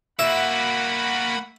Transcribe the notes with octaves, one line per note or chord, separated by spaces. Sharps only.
A#3 F#4 E5 F#5 B5